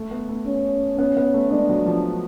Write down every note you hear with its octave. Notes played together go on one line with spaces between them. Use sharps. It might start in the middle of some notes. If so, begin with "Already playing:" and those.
Already playing: A3
B3
A3
C#4
B3 C#4
B3
A3
G#3 D4
F#3
F3